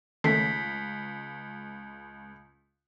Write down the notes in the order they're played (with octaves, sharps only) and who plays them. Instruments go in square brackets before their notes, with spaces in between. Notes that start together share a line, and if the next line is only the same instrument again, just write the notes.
[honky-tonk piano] C#2 [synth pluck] D#3 A3 C#4 [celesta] B6 C7